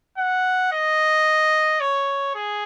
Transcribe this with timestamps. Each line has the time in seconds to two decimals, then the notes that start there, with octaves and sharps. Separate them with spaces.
0.18 F#5
0.72 D#5
1.80 C#5
2.35 G#4